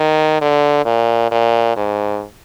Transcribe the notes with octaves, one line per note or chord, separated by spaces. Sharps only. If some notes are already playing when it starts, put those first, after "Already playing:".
Already playing: D#3
D3
A#2
A#2
G#2